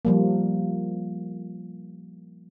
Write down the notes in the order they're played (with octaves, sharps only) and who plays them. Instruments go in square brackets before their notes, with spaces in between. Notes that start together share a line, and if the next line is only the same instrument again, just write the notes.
[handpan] F3 G3 A#3